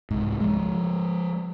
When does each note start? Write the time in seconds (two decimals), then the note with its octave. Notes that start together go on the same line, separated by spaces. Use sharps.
0.11 C2 G#2
0.40 F3 G#3